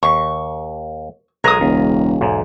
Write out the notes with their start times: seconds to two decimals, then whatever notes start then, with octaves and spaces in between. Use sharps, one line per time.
0.03 D#2 C#6
1.44 B1 F#3 G#3 A#4 D#6
1.61 E1 C#2
2.21 B1 E2 G#2